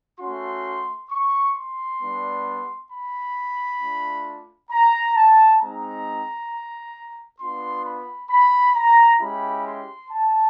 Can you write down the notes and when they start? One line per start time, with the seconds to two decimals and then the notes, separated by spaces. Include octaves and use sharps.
0.20 A3 C#4 F#4 C6
1.11 C#6
1.55 C6
2.00 G3 B3 D4
2.90 B5
3.81 A3 D4 F4
4.71 A#5
5.16 A5
5.60 G#3 C4 D#4 A#5
7.40 B3 D4 F4 C6
7.85 B5
8.30 B5
8.75 A#5
9.21 G#3 C#4 E4 G4 B5
9.65 C6
10.11 A5